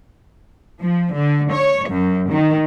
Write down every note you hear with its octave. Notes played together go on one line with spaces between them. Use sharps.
F3
D3
C#5
F#2
D#3